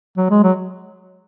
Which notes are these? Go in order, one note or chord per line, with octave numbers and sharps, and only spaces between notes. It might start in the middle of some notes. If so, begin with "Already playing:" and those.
F#3
G#3
F#3